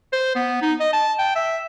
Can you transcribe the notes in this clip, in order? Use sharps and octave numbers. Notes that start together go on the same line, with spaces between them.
C5
B3
D#4
D#5
A5
G5
E5